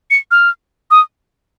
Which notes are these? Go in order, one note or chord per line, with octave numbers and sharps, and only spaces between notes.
C#7
F6
D#6